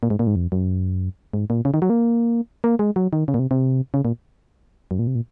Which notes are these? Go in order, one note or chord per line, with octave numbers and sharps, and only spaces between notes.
A#2
G#2
A#2
G#2
F2
F#2
G#2
A#2
C#3
D#3
F#3
A#3
A#3
G#3
F#3
D#3
C#3
A#2
C3
C3
C#3
A#2
F#2
A#2
C3
A#2